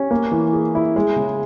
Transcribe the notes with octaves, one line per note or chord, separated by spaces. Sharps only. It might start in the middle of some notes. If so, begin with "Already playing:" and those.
Already playing: C#4 G4
A#3
E3
G#4
E4
G#3
C#3